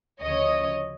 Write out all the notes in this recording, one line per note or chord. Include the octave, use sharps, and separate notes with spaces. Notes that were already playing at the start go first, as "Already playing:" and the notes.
D2 C#3 F3 C#5 D#5